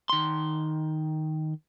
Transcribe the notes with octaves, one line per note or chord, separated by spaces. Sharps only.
D#3 C6